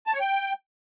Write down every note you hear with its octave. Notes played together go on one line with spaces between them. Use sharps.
A5
C#5
G5